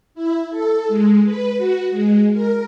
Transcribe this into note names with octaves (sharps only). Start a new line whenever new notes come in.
E4
A4
G#3
B4
F#4
G#3
A#4